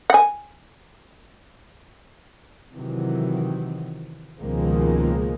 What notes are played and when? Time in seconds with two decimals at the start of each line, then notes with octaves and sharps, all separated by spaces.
0.10 F#5 G#5
2.74 C3 D#3 E3 F#3
4.41 C#2 B2 D#3 F3 G#3 A#3